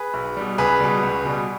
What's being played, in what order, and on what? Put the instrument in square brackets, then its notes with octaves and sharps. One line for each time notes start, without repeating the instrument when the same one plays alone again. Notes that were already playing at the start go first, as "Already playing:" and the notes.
Already playing: [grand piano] G#4 B4
B1
B2 G3
C#2 G#4 B4
B2 G3
C#2
B2 G3